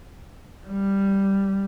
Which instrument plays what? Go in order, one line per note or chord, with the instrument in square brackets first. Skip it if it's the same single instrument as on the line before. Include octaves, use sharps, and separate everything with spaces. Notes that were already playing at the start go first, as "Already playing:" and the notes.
[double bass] G3